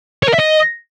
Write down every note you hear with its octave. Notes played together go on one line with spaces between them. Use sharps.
C#5
A#4
E5
D#5